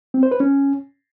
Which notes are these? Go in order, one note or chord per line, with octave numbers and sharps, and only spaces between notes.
C4
C5
B4
C#4